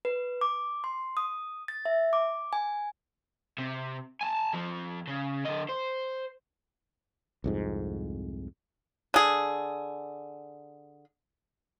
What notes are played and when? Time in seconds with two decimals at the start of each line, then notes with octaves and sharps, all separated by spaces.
0.05 B4
0.41 D6
0.84 C6
1.17 D#6
1.68 A6
1.85 E5
2.13 D6
2.53 G#5
3.58 C3
4.21 G#5 A5
4.53 F2 F3
5.07 C#3
5.45 D3 D#5
5.69 C5
7.44 C2 F2 G#2
9.14 D3 G#4